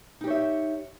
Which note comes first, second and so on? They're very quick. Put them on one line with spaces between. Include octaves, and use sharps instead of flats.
D#4 G4 C#5 E5